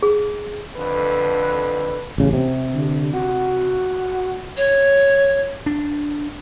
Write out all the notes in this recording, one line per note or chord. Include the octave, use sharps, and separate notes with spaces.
G#4
F2 D3 B4
A1 C#3
C3
D3
F#4
C#5
D4